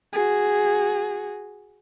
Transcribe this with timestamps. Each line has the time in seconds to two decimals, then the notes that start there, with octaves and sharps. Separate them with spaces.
0.13 F#4 G#4